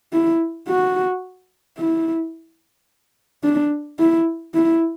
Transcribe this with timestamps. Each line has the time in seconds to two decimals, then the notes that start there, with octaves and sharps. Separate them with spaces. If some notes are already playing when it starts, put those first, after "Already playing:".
0.13 E4
0.68 F#4
1.78 E4
3.44 D4
3.99 E4
4.54 E4